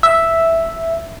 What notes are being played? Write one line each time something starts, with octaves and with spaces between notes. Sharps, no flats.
E5